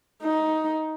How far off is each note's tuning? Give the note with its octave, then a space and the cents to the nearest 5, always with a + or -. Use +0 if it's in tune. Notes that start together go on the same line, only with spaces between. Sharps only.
D#4 +10